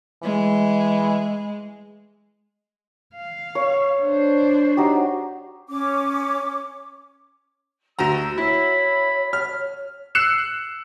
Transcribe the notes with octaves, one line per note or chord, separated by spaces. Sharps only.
E3 G#3
F5
C#5
D4 C5
D#4 F#4 G4
C#4 D6
D2 F#4 G4 F#5 A#5 E6
E4 C#5 B5
F6
E6 F#6 C7 C#7 E7